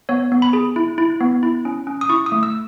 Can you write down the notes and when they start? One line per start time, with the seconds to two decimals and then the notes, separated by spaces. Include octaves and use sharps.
0.09 B3 C#5
0.32 B3
0.42 B5
0.53 G#4
0.76 E4
0.98 E4
1.21 B3
1.43 E4
1.65 C#4
1.87 C#4
2.01 D#6
2.09 E4 C#6
2.26 D#6
2.32 A3
2.43 E6